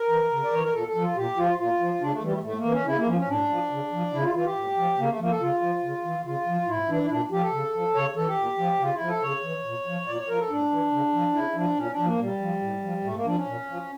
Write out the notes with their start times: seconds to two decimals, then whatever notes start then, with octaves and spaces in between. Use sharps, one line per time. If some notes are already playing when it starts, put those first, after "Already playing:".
Already playing: A#4
0.09 E3
0.32 C#3
0.44 D5
0.53 E3 C#5
0.63 A#4
0.73 A#2 A4
0.88 A4
0.95 F3
1.02 F4
1.16 A#2 G4
1.37 F3 F4
1.58 A#2 F4
1.80 F3
2.01 C#3 D4
2.12 A3
2.22 E3 G3
2.33 A3
2.43 A2 A3
2.58 A#3
2.65 E3
2.72 C#4
2.86 C#3 E4
2.97 A#3
3.07 F3 C#4
3.18 C#4
3.28 A2 D4
3.49 F3
3.71 C#3
3.92 F3
4.13 C#3 E4
4.23 F4
4.34 E3 F4
4.45 G4
4.56 A2
4.77 F3
4.98 C#3 A#3
5.08 A3
5.19 F3 A#3
5.30 A4
5.40 C#3 F4
5.61 F3
5.83 C#3
6.04 E3
6.25 C#3 F4
6.47 F3
6.68 A2 E4
6.89 E3 D4
7.04 E4
7.10 A#2 D4
7.31 F3 G4
7.42 A4
7.53 C#3
7.74 F3
7.95 C#3 C#5
8.16 E3 A4
8.27 G4
8.37 A#2
8.58 F3
8.80 C#3 F4
8.94 E4
9.01 F3
9.08 A4
9.22 C#3 C#5
9.43 E3
9.65 A#2
9.86 F3
10.07 A#2 D5
10.18 C#5
10.28 F3 A#4
10.39 A4
10.50 A2 D4
10.71 E3
10.92 C#3
11.14 F3
11.34 C#3 E4
11.55 F3 D4
11.77 A#2 C#4
11.91 D4
11.98 F3
12.05 A#3
12.19 A#2 G3
12.41 F3
12.62 A2
12.83 F3
13.04 A2 A3
13.15 A#3
13.25 F3 D4
13.36 C#4
13.46 A#2
13.68 F3